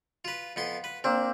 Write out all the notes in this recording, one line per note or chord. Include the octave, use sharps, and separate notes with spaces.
F4 B4
F2 B3 C6
B4
A#3 C4 D4